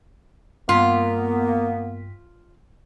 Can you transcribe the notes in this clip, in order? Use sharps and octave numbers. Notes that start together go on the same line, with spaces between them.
G2 A#3 B3 F4 B6